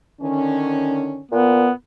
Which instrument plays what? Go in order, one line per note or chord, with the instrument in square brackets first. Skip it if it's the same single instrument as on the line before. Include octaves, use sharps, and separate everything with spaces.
[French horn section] D3 D#3 C#4
[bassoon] A#2 [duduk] B3